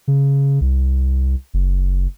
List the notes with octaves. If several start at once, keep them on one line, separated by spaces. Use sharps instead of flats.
C#3
C2
F#1